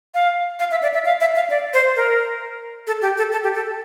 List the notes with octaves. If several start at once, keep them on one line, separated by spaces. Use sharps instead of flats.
F5
F5
E5
D5
E5
F5
E5
F5
D5
C5
A#4
A4
G4
A4
A4
G4
A4